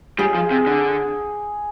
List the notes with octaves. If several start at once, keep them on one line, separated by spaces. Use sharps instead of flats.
G3 G#4
F3
C3
D3